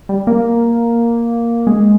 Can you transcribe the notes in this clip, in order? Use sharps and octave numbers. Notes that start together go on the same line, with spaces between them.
G3
A#3
G#3